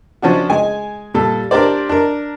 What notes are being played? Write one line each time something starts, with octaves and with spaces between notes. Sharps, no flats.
F3 C#4 D4 F#4
G#3 G#5
A#2 G3 A4
D4 G4 A#4 C5 D5
D4 A#4